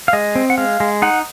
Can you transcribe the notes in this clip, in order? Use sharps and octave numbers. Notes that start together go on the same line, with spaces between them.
F5
G#3 D#5
C4
F#5
G#3 F5
G#3
D#4 F#5